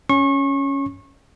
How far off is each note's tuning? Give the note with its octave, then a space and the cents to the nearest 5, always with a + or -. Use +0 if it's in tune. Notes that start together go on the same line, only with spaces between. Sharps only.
C#4 +0 C#6 -30